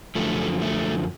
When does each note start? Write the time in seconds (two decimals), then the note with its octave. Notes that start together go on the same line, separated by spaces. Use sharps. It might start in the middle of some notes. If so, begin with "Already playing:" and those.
0.15 F#2 D3 F3 A3
0.62 A3